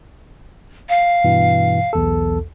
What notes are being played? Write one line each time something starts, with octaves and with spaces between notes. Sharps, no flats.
F5
G2 B2 E3
B1 E2 A4